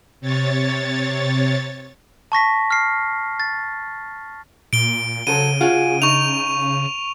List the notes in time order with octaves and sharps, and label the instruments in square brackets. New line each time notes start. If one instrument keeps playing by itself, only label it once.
[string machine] C3 C#5 A6
[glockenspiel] A5 C#6 A#6 B6
F6 C7
A6
[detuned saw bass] A#2 [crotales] D7 G7
[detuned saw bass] C#3 [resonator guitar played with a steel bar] F#3 A4 C5 [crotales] D#7
[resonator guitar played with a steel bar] F4 F#4 G#4
[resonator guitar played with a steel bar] D#4 [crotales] C#6 F7